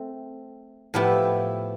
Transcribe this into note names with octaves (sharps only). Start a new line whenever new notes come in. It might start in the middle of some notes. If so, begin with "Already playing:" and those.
Already playing: A3 C4
A2 F3 B3 E4 G4